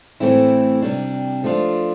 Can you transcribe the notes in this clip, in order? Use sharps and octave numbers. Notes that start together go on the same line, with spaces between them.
A2 E3 A3 C4 E4
C3 G3 D4
F3 A3 D4 F4